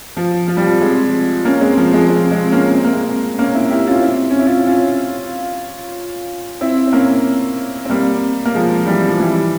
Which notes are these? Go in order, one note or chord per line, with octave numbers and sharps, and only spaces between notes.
F3
F3
G3
F3
G#3 C4
A#3 C#4
G#3 C4
F3
F3 G#3
G#3 C4
G#3 C4
A#3 C#4
C4
A#3
G#3 C4
A#3 C#4
C4 E4
E4 G4
C#4 F4
C4 E4
C#4
E4
C#4 F4
C#4 F4
C4 E4
C4
A#3 C#4
C4
G3 A#3
A#3
F3 G#3
E3 G3
F3
E3 G3